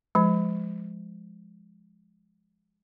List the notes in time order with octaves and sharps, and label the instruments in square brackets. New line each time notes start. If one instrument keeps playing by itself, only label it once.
[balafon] F3 G#3